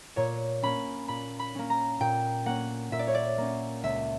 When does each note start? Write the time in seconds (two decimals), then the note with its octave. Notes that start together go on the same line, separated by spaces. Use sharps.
0.16 A#2 C#5
0.62 A#3 C#4 B5
1.08 A#2 B5
1.39 B5
1.55 A#3 C#4
1.70 A#5
2.00 A#2 G5
2.46 A#3 C#4 F#5
2.92 A#2 E5
2.99 D5
3.07 C#5
3.14 D5
3.38 A#3 C#4
3.83 C#2 E5